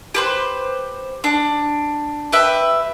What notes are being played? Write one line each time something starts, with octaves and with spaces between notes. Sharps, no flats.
G4 B4 C5
D4
G4 B4 E5